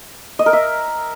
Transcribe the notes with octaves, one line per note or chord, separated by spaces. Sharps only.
D#5
A#4
E5